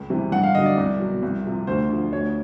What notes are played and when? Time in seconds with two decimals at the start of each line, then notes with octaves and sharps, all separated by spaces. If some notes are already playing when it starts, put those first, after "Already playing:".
Already playing: C#2
0.10 C3 E3 G3
0.32 G2 F#5
0.43 F5
0.55 D3 F#3 D#5
0.66 D5
0.78 C2
1.00 B2 F#3
1.23 C2
1.45 C3 F3
1.67 D2 C5
1.90 D3 F3
2.12 D2 C#5